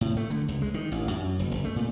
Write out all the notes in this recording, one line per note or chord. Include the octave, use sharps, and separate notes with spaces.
A2
A3
D3
C#2
G#3
D#3
A1
F#2
F#1
F#1
A3
A#2